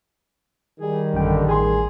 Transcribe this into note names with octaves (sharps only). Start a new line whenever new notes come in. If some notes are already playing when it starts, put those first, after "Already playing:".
D#3 G3 G#4
A1 F#2 D3 G5
A1 G#4 G#5 C6